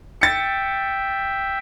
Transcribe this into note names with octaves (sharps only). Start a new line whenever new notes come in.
E5 G5 A6 C#7